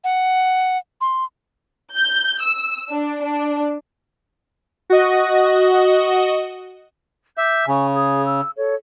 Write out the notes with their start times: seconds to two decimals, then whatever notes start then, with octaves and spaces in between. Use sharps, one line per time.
0.04 F#5
1.01 C6
1.95 G6
2.42 E6
2.91 D4
3.23 D4
4.90 F#4 D#5
7.38 E5 D6 G6
7.67 C#3 G#5 C#6
7.94 G#4 D#6 G#6
8.25 E6
8.56 A4 C#5